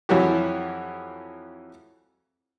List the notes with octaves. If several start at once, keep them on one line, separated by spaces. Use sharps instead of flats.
F2 E3 F#3 F#4 G4